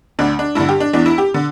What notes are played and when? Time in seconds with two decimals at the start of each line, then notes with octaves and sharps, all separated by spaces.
0.19 D2 D3 D4
0.39 D4
0.55 G2 D3 E4
0.69 G4
0.80 D4
0.93 E2 E3 D4
1.06 E4
1.18 G4
1.34 D3